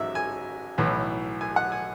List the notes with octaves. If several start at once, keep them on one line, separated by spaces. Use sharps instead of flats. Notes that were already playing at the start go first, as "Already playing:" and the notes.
Already playing: A1 G#2 F#3 E5
G#5
B1 A2 E3
G#5
F#5
G#5